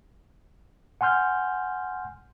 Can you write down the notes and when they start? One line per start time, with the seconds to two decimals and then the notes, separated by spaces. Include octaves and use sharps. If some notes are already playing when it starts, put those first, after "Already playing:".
1.01 F#5 G#5 C6 F6 G6